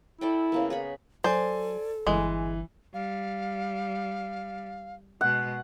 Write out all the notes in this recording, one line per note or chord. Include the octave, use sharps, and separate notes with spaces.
E4 A4 D5 G5
C#3 A#3 B3
G#4 C#5 B5
F#3 A4 C5 D5 G#5
G1 E3 G#3
G3 F5
B2 G#3 F#5